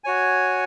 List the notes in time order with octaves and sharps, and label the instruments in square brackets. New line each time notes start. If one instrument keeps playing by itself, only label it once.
[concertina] F#4 C#5 G#5